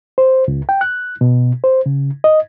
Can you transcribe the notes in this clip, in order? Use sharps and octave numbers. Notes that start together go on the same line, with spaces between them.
C5
C#2
G5
F#6
B2
C5
C#3
D#5